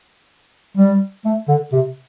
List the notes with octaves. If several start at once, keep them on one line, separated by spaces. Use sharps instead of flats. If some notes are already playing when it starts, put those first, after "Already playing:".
G3
A3
D3
C3